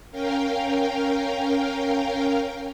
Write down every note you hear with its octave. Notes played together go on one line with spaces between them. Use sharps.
C#4 A#4 F5 G5